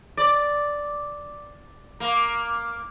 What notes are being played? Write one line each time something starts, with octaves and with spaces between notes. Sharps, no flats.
D5
A#3